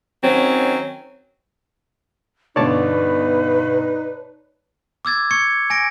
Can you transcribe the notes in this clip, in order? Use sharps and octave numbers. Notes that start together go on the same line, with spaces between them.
D#3 F#3 C4 C#4
G2 B2 D3 D#4 B4 C#5 D5 A5
D6 E6 G#6 A6
C#6 G#6 C#7
G#5 A#6 D7